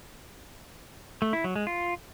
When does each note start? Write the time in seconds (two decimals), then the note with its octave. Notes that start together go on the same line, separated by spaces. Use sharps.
1.22 A3
1.33 E4
1.44 F#3
1.56 G#3
1.67 F4